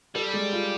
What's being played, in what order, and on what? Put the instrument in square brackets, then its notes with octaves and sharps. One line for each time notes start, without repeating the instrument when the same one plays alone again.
[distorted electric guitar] G3 [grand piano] A4
[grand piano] G#3
F4